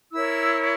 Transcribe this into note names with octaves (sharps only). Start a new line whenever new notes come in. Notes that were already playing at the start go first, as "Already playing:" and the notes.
E4 A#4 C#5 E6